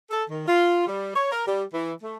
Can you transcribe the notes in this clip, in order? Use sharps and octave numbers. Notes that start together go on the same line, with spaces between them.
A4
D#3
F4
G3
C#5
A#4
G3
E3
A3